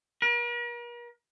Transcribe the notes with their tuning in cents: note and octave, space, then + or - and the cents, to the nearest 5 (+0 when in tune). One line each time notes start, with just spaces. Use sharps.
A#4 +45